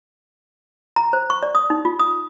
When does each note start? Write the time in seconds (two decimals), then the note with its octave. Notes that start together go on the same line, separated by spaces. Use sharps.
0.96 A#5
1.13 C5
1.30 C#6
1.43 D5
1.55 D#6
1.70 D#4
1.85 F4
1.99 D#6